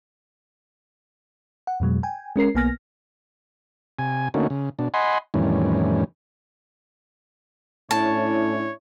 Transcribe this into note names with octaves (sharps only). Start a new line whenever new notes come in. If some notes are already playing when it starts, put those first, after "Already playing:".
F#5
F2 B2 F#3 G#3
G5 G#5
G#3 C#4 A#4 C7
B1 A#3 B3 G#5 F6 A#6
C3 G#5
D3 A3 A#3 C#4 D#4 F#4
C#3
B2 D4
D#5 F#5 G#5 B5 C6
F2 A2 D#3 E3 G3 C#4
A2 C#4 D4 E4 C#5 A5